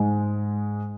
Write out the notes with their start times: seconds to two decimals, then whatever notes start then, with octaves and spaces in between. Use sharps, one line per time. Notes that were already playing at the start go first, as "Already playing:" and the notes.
Already playing: G#2 G#3